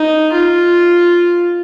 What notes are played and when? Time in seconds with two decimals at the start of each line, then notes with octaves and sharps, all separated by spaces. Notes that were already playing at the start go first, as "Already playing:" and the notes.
Already playing: D#4
0.33 F4